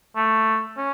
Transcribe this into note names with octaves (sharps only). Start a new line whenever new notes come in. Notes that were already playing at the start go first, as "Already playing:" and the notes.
A3
C#4